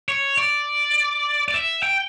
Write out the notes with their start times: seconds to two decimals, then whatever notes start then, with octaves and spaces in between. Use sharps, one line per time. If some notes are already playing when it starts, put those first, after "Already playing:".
0.09 C#5
0.38 D5
1.48 D5
1.54 E5
1.83 G5